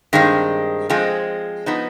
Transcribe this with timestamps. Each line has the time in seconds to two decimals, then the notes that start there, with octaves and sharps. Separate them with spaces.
0.13 G2 D#3 G#3 C4
0.90 F3 G#3 C4
1.66 F3 B3 D#4